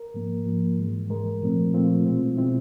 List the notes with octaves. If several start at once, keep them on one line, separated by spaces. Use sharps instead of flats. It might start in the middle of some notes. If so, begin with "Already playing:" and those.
Already playing: A#4
G#2 F3 A#3
G#2 F3 A#3
G#2 E3 G#3
G#2 E3 G#3 A#4
A#2 F3 A3 C4
A#2 F3 A3 C4 F4
B2 G#3 C4
B2 G#3 C4 E4